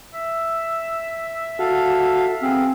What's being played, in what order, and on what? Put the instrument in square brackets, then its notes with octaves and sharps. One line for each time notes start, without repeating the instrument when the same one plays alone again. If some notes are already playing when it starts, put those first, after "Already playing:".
[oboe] E5
[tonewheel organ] F#4 [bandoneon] A4 F5
[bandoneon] B3 G#4 F5 [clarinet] C4